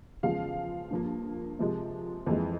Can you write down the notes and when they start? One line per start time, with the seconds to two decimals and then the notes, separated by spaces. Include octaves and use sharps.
0.23 E2 C#3 F3 G#3 F5
0.91 G2 F3 A#3
1.59 C3 F3 G#3
2.26 F2 E3 G#3